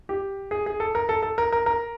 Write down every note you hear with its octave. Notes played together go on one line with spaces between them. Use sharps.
G4
G#4
G#4
A4
A#4
A4
A4
A#4
A#4
A#4